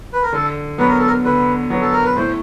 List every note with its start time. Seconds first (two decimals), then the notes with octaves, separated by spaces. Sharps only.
0.13 B4
0.23 A#4
0.33 D3 A4
0.78 F#3 B3 B4
0.88 A#4
0.99 A4
1.07 A#4
1.24 D3 B4
1.70 F#3 B3
1.81 A4
1.93 A#4
2.04 B4
2.16 A2 C5